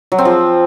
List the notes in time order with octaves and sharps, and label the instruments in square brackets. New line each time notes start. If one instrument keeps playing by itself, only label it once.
[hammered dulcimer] F#3
C4
F3